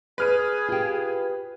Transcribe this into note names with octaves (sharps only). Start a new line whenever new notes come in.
G#4 B4 F6 D#7
F4 G4